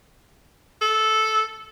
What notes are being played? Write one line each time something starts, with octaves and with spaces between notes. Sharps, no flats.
A4